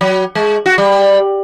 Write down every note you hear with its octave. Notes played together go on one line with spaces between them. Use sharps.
F#3
G#3
F#4
G3